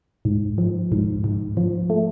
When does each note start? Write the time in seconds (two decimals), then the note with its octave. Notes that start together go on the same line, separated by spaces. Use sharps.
0.25 G#2
0.58 F3
0.92 G#2
1.24 G#2
1.57 F3
1.90 A3